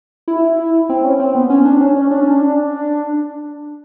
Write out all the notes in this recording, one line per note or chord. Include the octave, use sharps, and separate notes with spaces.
E4
C4
C#4
C4
B3
C#4
D4
C#4
C#4
D4
C#4
D4